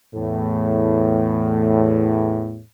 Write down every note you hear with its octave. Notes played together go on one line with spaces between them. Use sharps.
E2 A2